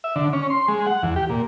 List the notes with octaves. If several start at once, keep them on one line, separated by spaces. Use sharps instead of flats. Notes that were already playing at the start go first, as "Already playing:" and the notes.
E5
D3
C#4
C6
G#3
F#5
E2
G4
A#2